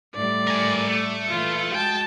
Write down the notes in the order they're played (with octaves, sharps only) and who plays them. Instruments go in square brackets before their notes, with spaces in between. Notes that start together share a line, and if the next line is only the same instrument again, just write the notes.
[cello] A2 G3 [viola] D5
[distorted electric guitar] A#4 G#5
A3
[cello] A#2 E3 [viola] F4
[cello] G#3 F#4 [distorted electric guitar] G5 [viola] A5